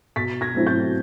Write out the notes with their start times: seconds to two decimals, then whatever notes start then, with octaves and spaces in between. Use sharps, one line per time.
0.16 B2 A6 B6
0.41 G#6 A#6
0.54 F#3 A3 C4 E4
0.67 G6 A6